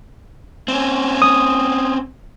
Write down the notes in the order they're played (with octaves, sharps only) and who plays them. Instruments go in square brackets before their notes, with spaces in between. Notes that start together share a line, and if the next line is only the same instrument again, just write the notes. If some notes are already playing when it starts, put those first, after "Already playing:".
[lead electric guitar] C4 C#4
[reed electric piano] D#6